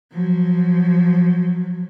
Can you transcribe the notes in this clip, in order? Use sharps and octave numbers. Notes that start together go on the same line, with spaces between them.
F3 F#3